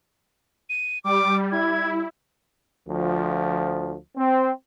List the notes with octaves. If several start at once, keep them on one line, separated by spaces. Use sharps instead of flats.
D#7
G3 D6
E4 G#6
D2 F3
C4